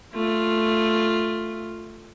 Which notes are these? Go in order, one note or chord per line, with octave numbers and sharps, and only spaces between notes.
A3 F4